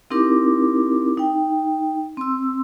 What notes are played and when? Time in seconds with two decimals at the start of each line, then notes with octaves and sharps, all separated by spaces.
0.10 C4 D#4 E4 G4 A#4 D6
1.18 D#4 G5
2.17 C4 C6 E6